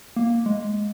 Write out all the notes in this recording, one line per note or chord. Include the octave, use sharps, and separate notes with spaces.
A#3
G#3